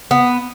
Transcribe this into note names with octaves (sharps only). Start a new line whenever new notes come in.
B3